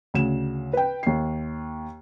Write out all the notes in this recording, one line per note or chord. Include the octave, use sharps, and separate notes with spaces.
D2 C#3 E7
B4 G5
D#2 C7